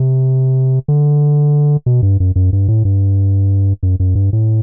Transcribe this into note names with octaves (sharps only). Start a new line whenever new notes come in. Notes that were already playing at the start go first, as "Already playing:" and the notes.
Already playing: C3
D3
B2
G2
F#2
F#2
G2
A2
G2
F#2
F#2
G2
A2